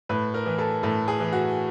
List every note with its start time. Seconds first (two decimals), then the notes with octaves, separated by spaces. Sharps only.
0.09 A2 B4
0.34 A#4
0.46 E3
0.58 A4
0.83 A2 A4
1.08 G#4
1.20 E3
1.33 F#4